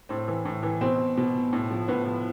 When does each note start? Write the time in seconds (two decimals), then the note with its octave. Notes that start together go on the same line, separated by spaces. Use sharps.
0.09 A2 C4
0.28 E3
0.45 A2
0.63 E3
0.81 B2 C4
1.17 B2
1.53 A2
1.71 F3
1.88 A2 B3
2.06 F3